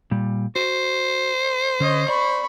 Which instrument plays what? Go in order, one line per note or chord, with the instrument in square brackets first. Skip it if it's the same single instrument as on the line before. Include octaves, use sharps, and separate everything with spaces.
[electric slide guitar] A#2 G3
[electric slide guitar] F#4 [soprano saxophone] C5
[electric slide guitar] D3 C#4 [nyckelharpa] C#5 D#5
[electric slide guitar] D5 [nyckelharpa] B5 C#6